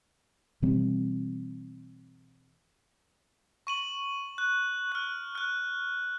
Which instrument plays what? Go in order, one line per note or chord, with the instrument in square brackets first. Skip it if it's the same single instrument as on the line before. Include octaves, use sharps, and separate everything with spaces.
[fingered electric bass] B2 E3 G3 C4
[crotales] C#6 D#7 F#7
F#6
F6 F#6
F6 F#6